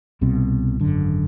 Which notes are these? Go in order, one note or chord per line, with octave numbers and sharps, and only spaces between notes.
C2 B2 G3 C4
G#1 F#2 D3